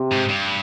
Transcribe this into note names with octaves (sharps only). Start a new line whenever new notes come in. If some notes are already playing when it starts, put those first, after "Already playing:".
Already playing: C3
G#2
G2